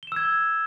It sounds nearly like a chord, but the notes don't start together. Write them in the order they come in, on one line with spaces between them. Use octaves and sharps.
G7 E7 E6 G#6